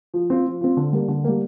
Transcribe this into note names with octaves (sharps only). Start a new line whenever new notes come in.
F3
C4 F4
F3
C4 F4
D3
G3 A#3
D3
G3 A#3